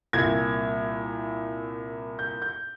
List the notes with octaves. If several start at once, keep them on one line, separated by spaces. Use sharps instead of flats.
C2 A#2 G#6
G6
G6